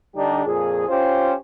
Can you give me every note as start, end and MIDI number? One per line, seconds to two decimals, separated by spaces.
0.16 0.42 50
0.16 0.42 55
0.16 0.42 62
0.16 0.42 63
0.16 0.42 67
0.46 0.88 41
0.46 0.88 46
0.46 0.88 68
0.88 1.33 61
0.88 1.33 65
0.88 1.33 67
0.88 1.33 72